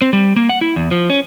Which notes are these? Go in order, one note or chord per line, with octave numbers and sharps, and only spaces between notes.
C4
G3
A#3
F#5
E4
E2
F3
C#4